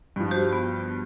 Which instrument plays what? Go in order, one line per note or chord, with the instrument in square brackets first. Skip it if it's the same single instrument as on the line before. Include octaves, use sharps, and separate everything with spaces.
[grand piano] G2 F3
[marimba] F#4 G4 C5
B3